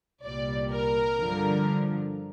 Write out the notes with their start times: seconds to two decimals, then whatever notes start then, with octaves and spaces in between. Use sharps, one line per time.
0.24 C2 A#2 G3 D5
0.72 A#4
1.19 G2 D3 F3